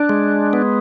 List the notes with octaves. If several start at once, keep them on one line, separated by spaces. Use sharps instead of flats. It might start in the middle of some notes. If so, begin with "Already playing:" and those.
Already playing: D4
G#3
B3